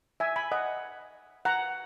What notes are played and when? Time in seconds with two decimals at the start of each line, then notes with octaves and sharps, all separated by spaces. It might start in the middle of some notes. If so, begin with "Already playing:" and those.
0.20 E5 G#5
0.36 G#5 B5
0.52 D#5 F#5
1.45 F#5 A#5